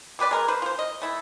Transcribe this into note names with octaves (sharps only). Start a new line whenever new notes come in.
B2 G4 B4 D5
G#3 A#4 B4
B4 C5
F4 C5
D#5
A3 E4